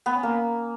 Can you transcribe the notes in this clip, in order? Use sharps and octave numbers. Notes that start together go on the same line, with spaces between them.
B3
C#4
A#3